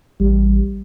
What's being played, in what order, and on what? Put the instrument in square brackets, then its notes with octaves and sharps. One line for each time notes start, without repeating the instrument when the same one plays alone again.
[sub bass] A1 [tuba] G3